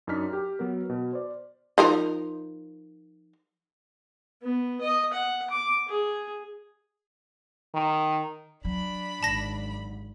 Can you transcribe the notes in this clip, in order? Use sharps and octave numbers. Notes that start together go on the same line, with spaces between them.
F#2 D4 D#4 F6 B6
G4
F#3 B3 A#4
B2
C5 D5
F3 D#4 A#4
B3
D#5
F#5
D6
G#4
D#3
F#3 D4 B5
G#1 A5 A#6